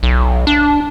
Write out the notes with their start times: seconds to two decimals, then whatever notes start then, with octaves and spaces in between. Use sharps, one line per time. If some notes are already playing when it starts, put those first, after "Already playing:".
0.03 B1
0.47 D4